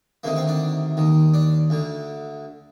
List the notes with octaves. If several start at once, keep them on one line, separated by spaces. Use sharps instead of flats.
D2 C3 D#3 A#3
C4
D4
D#2 D#3
D4
D2 D3